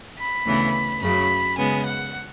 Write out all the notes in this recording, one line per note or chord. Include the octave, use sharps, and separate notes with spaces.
B5
D2 C#3 E3 B3
F#2 C#3 F#3 B5
C#3 G#3 B3 G#5
F#5